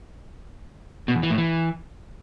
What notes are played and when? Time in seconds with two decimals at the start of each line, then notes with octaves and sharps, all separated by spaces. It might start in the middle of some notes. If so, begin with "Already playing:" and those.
1.08 B2
1.16 E2
1.23 E3
1.30 A2
1.38 E3